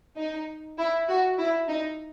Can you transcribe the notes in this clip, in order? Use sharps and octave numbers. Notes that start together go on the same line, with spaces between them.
D#4
E4
F#4
E4
D#4